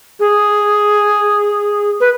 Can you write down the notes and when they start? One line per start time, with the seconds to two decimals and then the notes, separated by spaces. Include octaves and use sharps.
0.20 G#4
2.00 B4